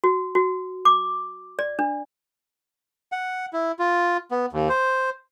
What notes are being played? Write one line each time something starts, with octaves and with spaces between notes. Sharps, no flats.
F#4
F#4
D6
D5
D4
F#5
E4
F4
B3
D#2
C5